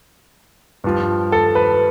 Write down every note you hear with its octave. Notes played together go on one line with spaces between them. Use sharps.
G2 F3
A4
B4